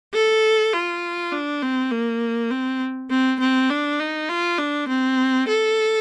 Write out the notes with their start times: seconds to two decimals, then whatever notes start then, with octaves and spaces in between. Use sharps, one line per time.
0.14 A4
0.73 F4
1.32 D4
1.62 C4
1.92 A#3
2.51 C4
3.10 C4
3.40 C4
3.70 D4
4.00 D#4
4.29 F4
4.59 D4
4.88 C4
5.48 A4